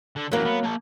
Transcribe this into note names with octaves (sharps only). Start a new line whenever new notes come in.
D3
F#2 E3 F#3 A#3
B3
A#3 A5